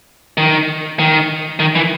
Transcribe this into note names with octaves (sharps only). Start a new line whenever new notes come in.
D#3
D#3
D#3
E3